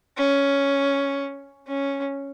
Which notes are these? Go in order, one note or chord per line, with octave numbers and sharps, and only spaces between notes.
C#4
C#4